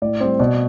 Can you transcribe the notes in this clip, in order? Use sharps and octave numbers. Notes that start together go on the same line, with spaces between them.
A2 D5
G3 C4 C5
B2 D5